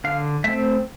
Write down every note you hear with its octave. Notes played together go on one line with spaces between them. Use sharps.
D3 F5
A3 C4 E5